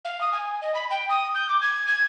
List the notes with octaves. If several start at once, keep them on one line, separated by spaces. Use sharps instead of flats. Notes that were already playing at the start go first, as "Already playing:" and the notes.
F5
D#6
G#5
D#5
B5
G5
D#6
G6
D6
G#6
G#6